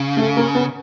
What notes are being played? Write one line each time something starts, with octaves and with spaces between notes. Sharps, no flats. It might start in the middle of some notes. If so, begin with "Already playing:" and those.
Already playing: C#3
A3
A#3
B3